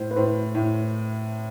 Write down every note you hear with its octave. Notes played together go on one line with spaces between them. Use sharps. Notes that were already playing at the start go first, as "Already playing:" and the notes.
Already playing: A2 C5
B4
A2 C5
A2